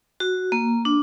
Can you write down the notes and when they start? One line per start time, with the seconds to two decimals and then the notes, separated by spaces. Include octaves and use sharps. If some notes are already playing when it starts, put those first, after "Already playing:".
0.20 F#4
0.52 A#3
0.85 D4